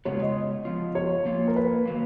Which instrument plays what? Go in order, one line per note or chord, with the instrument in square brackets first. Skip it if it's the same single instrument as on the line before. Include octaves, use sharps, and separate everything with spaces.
[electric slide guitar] C#3 G#3 B3 F4 [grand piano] C#5
[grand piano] D#5
[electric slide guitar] F3 B3 F4
[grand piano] C#5
[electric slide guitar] F3 A#3 F4
[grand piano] A#4
B4
[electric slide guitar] D#3 F#3 A#3